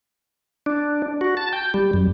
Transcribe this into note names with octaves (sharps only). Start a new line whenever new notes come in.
D4
F#4
A5
G5
G3
F#2